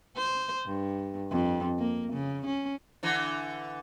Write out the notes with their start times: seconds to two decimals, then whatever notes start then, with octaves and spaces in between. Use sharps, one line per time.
0.17 C5
0.66 G2
1.31 F2
1.79 A#3
2.13 C#3
2.46 C#4
3.03 D3 E3